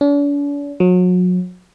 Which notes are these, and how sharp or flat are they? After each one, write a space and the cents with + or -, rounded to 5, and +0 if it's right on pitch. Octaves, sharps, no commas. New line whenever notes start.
D4 -45
F#3 -35